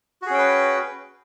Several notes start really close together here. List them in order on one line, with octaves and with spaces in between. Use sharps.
F#4 G#4 C#4 G5 B4